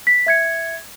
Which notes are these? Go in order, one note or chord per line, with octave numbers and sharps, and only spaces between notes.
B6
E5 G#6 C#7